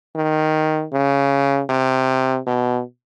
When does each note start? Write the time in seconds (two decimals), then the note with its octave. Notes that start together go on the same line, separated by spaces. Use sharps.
0.15 D#3
0.92 C#3
1.69 C3
2.46 B2